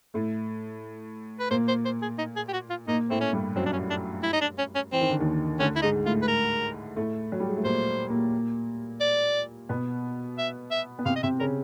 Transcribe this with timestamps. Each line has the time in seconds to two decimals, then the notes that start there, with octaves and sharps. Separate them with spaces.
0.14 A2 A3
1.40 B4
1.50 A#2 A#3 C5
1.68 C5
1.85 C5
2.02 G#4
2.19 D#4
2.36 G#4
2.48 G4
2.53 F#4
2.70 F4
2.87 A#2 A#3 D#4
3.10 A2 A3 C4
3.21 C#4
3.33 G2 G3
3.56 F#2 F#3 C4
3.66 D4
3.73 C#4
3.90 D4
4.23 E4
4.33 D#4
4.41 D4
4.58 C#4
4.75 C#4
4.92 E3 C4
5.01 D#3
5.10 D3
5.19 D#2 D#3
5.60 D2 D3 C#4
5.76 E4
5.82 G#2 G#3 D#4
6.06 A2 A3 F4
6.22 B4
6.28 A#4
6.96 A2 A3
7.32 F#3
7.40 G3
7.49 G#3
7.57 A3
7.64 A#2 A#3 C5
8.10 A#2 A#3
9.01 D5
9.69 B2 B3
10.38 E5
10.71 E5
10.99 B3
11.06 C3 C4 F5
11.16 D#5
11.23 C3 C4 E5
11.40 C#3 C#4 A#4